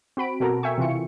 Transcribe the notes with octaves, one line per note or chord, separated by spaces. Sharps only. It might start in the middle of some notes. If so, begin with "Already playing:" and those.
C4 F#4 B5 D7
B2 F#4 A4 A#4 A#5
E5 G5 G#5 C#6
C3 E3 F4 C#7